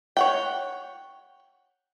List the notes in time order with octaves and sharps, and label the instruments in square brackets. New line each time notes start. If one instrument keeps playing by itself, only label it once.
[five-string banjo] C#5 F#5 G5